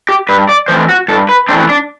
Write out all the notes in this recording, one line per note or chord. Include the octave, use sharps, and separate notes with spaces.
G4
G2 B4
D5
E3 A3 C4 C5
F#4
G2 A4
B4
E3 A3 C4 D4
D4